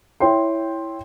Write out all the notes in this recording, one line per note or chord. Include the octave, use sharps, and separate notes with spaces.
E4 C#5 G5 C6